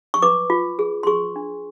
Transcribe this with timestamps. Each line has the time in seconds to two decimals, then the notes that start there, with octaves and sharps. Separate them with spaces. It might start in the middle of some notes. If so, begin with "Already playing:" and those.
0.14 C#6
0.22 B4 D6
0.50 F4
0.79 G#4
1.03 C6
1.07 G#4 C#6
1.36 D4